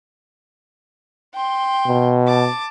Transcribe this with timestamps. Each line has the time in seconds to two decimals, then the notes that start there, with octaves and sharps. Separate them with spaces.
1.34 G5 C6
1.87 B2
2.27 A5 D6